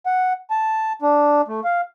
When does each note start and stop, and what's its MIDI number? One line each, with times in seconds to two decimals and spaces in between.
0.06 0.33 78
0.51 0.93 81
1.02 1.42 62
1.48 1.60 57
1.65 1.81 77